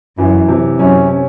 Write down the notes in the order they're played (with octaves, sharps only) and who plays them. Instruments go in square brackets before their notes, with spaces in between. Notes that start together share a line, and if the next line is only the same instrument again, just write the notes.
[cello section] F#2 [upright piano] E3
[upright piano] C3
[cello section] F#2 [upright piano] C#4
[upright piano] C#4